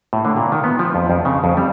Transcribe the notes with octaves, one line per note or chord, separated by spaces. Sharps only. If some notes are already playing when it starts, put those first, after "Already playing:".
A2
D3
A#2
D#3
B3
F3
F2
F2
C#3
F2
G3